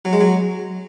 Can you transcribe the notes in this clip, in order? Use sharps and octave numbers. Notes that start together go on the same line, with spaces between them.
F#3
G#3
F#3